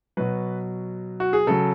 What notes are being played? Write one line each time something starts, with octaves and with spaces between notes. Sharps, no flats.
B2 F#3 B4
F#4
G#4
C#3 F#3 A4